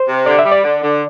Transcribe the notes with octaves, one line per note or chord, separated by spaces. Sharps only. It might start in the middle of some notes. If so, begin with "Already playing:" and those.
Already playing: C5
C3
D3 D5
E5
G3
D5
D3
D3